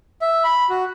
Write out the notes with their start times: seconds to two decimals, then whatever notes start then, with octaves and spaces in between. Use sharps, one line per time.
0.22 E5
0.44 B5
0.70 F#4